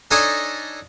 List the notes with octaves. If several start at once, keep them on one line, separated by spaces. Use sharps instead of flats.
D4 D#4 A4 C#5 D#5 G#5